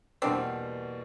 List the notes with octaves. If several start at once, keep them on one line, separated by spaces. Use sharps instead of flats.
E2 B2 G3 A#3 C4 D4